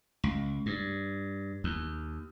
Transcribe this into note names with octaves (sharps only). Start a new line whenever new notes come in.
C#2
G2
D#2